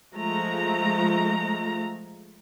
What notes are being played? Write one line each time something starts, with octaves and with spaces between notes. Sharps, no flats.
F3 G#3 A3 A#5